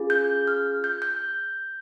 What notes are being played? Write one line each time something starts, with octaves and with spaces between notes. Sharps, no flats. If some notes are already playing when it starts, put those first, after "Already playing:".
Already playing: C#4 F4 G#4
G6
F6
G6
G6